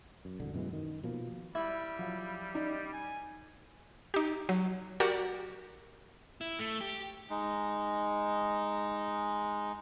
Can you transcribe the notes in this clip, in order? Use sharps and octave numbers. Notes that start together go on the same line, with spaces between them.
F#2
E1 C2 D3
F#2 B2 E3 G#3
D#3
B2 F3 A#3
G3 E4
F3 F#3
D#4 D5
G#5
D#4 G4
F#3
F#4 G4 A#4 D5 F#5
E4
A3
G4
G#3 D#4